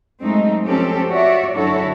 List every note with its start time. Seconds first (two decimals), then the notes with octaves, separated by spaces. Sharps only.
0.21 F#2 G#3 A3 C4 D#4
0.65 F3 C4 C#4 G4 A4
1.08 F#4 C#5 D5 E5
1.54 F#2 D3 E4 F#4 A4 C#5